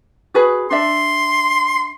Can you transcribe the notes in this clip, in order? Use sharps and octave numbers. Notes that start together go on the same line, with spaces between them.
F#4 G#4 B4
D4 D5 E5 C6